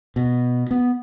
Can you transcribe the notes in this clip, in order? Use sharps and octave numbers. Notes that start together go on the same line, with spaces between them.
B2
B3